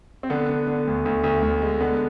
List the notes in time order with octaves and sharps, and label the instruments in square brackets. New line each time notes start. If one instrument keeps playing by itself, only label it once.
[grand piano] C4
D3 B3
D3
D3
D2
D2
D2
D2
G#3
D3 B3